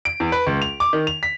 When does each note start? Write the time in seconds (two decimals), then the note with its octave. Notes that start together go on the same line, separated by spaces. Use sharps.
0.05 D7
0.20 E2
0.32 B4
0.47 C#2
0.62 F7
0.80 D6
0.93 D#3
1.07 F7
1.23 B6